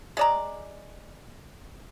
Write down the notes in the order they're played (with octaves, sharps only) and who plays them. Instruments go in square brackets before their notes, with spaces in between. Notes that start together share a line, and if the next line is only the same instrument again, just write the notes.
[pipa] G#3 D5 A#5